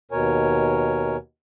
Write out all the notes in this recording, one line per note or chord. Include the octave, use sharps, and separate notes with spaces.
D#2 B2 A#4 C#5 G#5